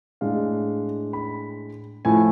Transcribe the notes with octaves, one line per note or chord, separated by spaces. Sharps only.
A2 G#3 D4 F5
B5
A2 F3 A3 E4 G#5